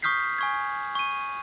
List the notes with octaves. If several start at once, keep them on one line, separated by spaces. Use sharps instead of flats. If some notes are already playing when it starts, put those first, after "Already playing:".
C#6 D#6 F6 G6 B6 C7
G#5 C#6 G#6
C#6 D#7